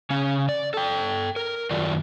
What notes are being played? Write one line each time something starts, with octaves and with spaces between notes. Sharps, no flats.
C#3 C#4
D5
A4 G5
A#4
F#2 D#3 F4 D5